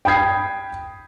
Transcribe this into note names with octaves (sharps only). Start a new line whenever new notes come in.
G5 B5 D#6 G#6 C7